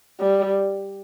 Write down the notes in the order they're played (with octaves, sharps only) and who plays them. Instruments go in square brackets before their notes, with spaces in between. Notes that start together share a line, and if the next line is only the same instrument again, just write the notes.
[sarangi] G3